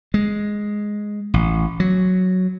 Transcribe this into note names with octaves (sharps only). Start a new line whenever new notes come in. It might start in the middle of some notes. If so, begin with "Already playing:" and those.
G#3
A1
F#3